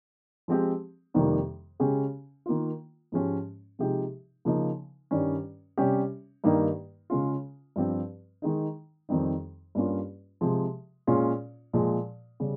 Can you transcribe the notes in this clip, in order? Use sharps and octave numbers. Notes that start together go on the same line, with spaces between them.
F3 G#3 C4 G4
F2 C3 D#3 G3 A#3
C#3 G#3 C#4 G4
D#3 A#3 F4
G#2 F3 G#3 C#4 G4
C3 F3 G#3 D#4 G4
C#3 F3 A#3 D#4
G2 D#3 G3 C#4
C3 G3 C#4 G4
G2 D#3 A#3 D#4 G4
C#3 G#3 C#4 F4
G2 F3 C4 G4
D#3 G#3 D#4
F2 D#3 G3 C4 D#4
G2 G3 A#3 C#4 F4
C3 F3 G#3
A#2 G#3 C#4 F4
A#2 F3 G#3
C#3 G3